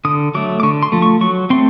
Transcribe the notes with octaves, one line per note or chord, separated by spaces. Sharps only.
D3 D#6
F#3 A3 D6
D6
D3 C#6
C6
F3 A3
C#6
F#3 C#6
A3 C4 C6